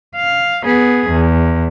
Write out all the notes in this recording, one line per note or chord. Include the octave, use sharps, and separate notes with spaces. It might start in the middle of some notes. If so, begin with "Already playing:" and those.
F5
B3 G#4
E2